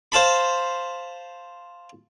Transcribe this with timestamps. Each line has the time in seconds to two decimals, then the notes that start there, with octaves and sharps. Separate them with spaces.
0.12 C5 F5 A5 B5